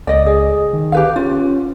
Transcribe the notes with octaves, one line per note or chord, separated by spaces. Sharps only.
C#2 D5 D#5
G#4
D#3
G4 B4 F5
C#4 F4